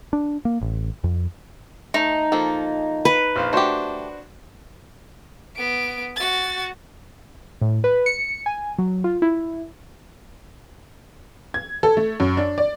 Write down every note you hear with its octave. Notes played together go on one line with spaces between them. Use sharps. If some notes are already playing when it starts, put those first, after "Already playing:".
D4
A#3
A1
F2
A3 D#4
F3 A#3 A4
B4
A#1 C5 F5
A3 D4 F#4 G4 C5
B3 D7
F#4 A6
A2
B4
C#7
G#5
F#3
F4
E4
G#6
A4
A3
F#2
D4
D5